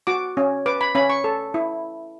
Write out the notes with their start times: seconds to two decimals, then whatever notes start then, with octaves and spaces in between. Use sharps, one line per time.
0.07 F#4 D6
0.37 C#4
0.66 B4 D6
0.81 B5
0.95 C#4 B5
1.10 C#6
1.24 A4
1.54 E4